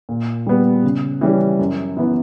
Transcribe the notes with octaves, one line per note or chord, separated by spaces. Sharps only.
A#2
G3 B3
C#3
E3 G3 C#4
F#2
E3 B3